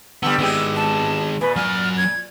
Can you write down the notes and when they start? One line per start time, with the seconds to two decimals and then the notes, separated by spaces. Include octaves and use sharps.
0.23 D3 G3 B3 E6
0.39 D#3 G#3 B3 E4 G4
0.76 A5
1.41 A#2 B4
1.56 F#3 G#5 F6
1.97 G#6